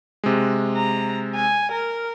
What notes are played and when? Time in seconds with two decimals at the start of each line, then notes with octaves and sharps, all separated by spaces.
0.24 C3 G#3
0.77 A#5
1.35 G#5
1.72 A#4